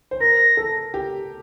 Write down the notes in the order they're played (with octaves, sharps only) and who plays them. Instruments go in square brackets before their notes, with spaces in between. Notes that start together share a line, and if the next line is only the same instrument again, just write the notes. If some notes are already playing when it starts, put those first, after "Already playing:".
[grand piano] C5
[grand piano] A#4 [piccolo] A#6
[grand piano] A4
G4